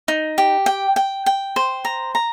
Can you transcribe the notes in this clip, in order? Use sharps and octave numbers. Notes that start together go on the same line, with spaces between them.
D#4
G4
G5
G5
G5
C5
A#5
A#5